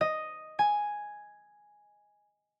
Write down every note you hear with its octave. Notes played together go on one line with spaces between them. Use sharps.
D#5
G#5